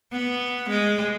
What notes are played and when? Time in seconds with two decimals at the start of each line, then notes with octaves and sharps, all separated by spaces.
0.12 B3
0.69 G#3